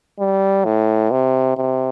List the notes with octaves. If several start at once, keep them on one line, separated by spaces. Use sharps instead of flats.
G3
A2
C3
C3